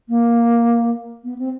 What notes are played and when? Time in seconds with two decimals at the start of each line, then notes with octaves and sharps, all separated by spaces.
0.09 A#3
1.24 B3
1.38 C4